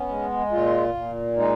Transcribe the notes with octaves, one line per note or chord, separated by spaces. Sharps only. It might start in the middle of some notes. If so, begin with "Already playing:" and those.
Already playing: B3 C#4
G#3
A#2 F4
A#2
G#3 D#4